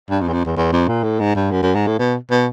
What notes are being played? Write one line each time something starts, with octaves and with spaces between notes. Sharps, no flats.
G2
F2
E2
F2
E2
E2
F2
A#2
A2
G#2
G2
F#2
F#2
G#2
A2
B2
B2